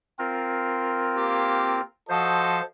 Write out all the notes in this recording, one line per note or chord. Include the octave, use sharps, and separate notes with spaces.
C4 F4 A#4
A#3 G4
F3 F#4 A4 C5 D#5